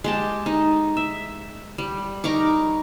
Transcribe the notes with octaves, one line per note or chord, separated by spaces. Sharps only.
G#3 G4 A5
D#4
E5
G3
D#4 A#4 C#6 D6